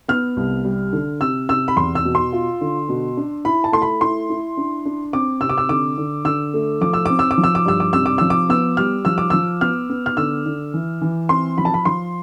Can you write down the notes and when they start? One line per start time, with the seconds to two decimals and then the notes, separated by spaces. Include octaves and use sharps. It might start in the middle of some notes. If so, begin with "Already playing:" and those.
0.08 B3 F6
0.37 C2
0.65 G3
0.93 D3
1.21 C3 E6
1.49 C3 E6
1.68 B5
1.77 E2 C6
1.95 E6
2.05 B2
2.15 C6
2.33 F4
2.61 D3
2.89 B2
3.17 D4
3.45 E4 B5
3.64 A5
3.72 A3 C6
3.82 B5
4.01 E4 C6
4.30 E4
4.57 D4
4.85 D4
5.13 C4 D6
5.41 C3 E6
5.49 D6
5.58 E6
5.69 D3 D6
5.98 D3
6.25 D3 E6
6.54 A3
6.81 F3 D6
6.93 E6
7.06 C4 D6
7.19 E6
7.31 D6
7.38 F3
7.44 E6
7.55 D6
7.65 G2 E6
7.80 D6
7.93 C3 E6
8.06 D6
8.18 F3 E6
8.30 D6
8.49 B3 E6
8.77 G3 F6
9.05 F3 E6
9.18 D6
9.30 F3 E6
9.61 B3 F6
9.90 B3
10.06 F6
10.17 D3 E6
10.46 D3
10.74 E3
11.02 E3
11.29 C4 C6
11.58 F3 B5
11.65 A5
11.74 B5
11.85 F3 C6